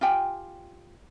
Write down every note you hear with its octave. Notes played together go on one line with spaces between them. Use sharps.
F4 G4 G5 G#5